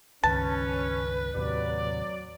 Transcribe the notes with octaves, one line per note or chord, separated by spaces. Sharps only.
C#2 G2 D#3 C#4 B4 A5
D#2 A2 C3 F#3 D5